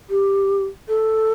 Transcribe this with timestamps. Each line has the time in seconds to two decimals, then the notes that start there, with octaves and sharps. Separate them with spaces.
0.10 G4
0.88 A4